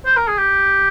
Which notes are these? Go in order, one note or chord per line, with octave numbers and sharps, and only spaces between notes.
C5
A#4
G#4
G4